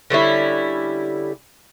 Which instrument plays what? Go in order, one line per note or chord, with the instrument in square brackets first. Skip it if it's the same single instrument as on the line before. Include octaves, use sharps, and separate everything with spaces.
[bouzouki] D3 G3 C#4 E4